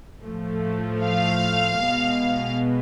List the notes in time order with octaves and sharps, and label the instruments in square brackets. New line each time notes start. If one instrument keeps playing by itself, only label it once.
[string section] A2 F3 A3
F5
B2 G#3 B3